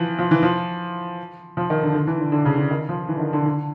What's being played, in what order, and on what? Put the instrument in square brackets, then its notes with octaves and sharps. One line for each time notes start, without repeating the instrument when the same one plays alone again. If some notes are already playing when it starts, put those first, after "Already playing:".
Already playing: [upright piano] E3 F3
F3
E3
F3
F3
D#3
D3
D3
E3
D3
D3
C#3
D3
D#3
F3
E3
D3
D#3
D3
D3